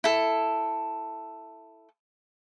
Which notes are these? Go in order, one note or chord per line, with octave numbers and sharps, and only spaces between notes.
E4 A4